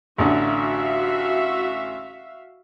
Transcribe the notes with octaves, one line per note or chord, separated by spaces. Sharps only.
A1 D3 F#4 E5 F5